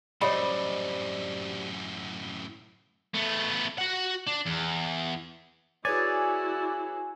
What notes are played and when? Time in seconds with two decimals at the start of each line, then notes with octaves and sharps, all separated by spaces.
0.21 F#2 A2 G3 C5 C#5 D#5 B5
3.14 A3 B3
3.78 F#4 F#5
4.28 D4
4.47 E2
5.85 E4 F#4 G#4 B4 C#5 D5 G#5